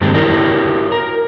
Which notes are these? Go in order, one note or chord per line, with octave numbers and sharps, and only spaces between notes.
G2 D#3 G#3 A3 C4 G4
E4 F#4 G4 A#4 C#5
A#4